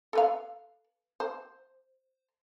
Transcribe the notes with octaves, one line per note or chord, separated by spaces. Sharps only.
A4 B4 F5
C5